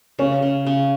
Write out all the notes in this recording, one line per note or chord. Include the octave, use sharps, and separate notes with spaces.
C#3 C#4
C#3
C#3